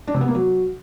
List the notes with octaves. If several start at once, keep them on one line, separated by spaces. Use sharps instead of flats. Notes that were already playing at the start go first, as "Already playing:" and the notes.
D4
C3
B3
A#3
F#3